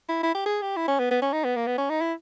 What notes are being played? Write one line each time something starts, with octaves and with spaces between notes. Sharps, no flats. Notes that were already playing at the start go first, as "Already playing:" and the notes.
E4
E4
G4
G#4
G4
E4
C#4
B3
B3
C#4
D#4
B3
A#3
B3
C#4
D#4
E4